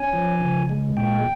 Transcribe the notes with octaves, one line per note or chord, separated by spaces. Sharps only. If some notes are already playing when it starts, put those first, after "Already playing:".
Already playing: C#4 G#5
F3
C#3
G#3
A#2 G5